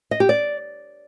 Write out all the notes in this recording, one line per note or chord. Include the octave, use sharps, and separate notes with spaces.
D#5
G4
D5